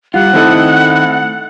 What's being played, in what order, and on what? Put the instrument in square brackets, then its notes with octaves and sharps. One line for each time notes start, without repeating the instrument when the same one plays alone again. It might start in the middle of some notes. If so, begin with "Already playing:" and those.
[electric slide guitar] G3 F4 [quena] F#5
[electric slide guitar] D#3 A3 D#5 [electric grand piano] C4 E4 A4